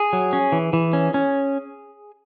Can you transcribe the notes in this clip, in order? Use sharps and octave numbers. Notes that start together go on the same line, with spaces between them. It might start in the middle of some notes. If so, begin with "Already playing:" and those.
Already playing: G#4
F#3
C#4
E3
E3
C#4
C#4